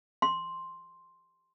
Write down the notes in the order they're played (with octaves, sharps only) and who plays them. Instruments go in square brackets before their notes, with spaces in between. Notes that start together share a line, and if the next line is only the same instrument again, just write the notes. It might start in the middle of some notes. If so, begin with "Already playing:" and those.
[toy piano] C6